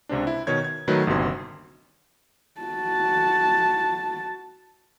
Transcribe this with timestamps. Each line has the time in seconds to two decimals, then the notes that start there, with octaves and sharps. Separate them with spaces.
0.09 C#2 C3 C4 D4
0.27 E4
0.47 B2 D#3 C#5 G#6
0.64 G#6
0.88 D#3 F#3 A3 F#4 B4
1.07 G1 D#2 C3 F#4 C6
2.61 F#4 A5